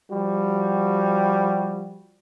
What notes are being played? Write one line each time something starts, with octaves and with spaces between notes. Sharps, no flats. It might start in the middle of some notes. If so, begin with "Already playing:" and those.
F3 G3 F#4